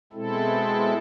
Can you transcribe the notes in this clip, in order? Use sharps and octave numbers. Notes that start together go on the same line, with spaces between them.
B2 G#3 C4 E4 A4